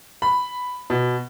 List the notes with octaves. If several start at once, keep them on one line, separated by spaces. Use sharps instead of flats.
B5
B2